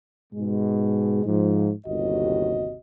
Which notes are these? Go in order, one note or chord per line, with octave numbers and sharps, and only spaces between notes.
G#2 B2 G#3
G#2 F3
G1 D#2 C3 F#4 D#5